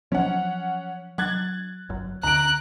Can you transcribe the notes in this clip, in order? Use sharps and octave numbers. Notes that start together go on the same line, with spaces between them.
F3 F#3 C#4 F#5
F#3 F#6 G#6 A6
G1 F#2
D2 D3 A#5 F#6 D7